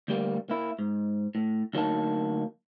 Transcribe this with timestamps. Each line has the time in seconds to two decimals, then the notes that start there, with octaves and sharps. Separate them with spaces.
0.08 D2 G3 A#3
0.50 A#3 E4
0.79 G#2
1.35 A2
1.74 D2 F#3 A#3 D#4 A5